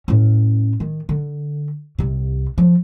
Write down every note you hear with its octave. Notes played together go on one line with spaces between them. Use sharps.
A2 C#4
D#3
D3
C2 C3
F3